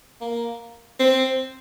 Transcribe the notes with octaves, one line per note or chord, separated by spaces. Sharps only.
A#3
C4